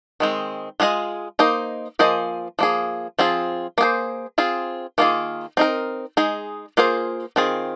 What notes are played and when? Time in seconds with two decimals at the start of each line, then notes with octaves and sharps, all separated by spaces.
0.20 D#3 G#3 C4
0.80 G#3 F4 G#4 D#5
1.39 A#3 D#4 C5 D#5
1.99 F3 A#3 G#4 C5 D#5
2.59 F3 A#3 G#4
3.19 F3 C4 F4 G#4
3.78 A#3 G#4 C5
4.38 C4 F4 G#4
4.98 D#3 A#3 F4 G#4
5.57 C4 D#4 A#4
6.17 G#3 D#4 G#4
6.77 A#3 F4 G#4 C5
7.36 D#3 C4 F4 G#4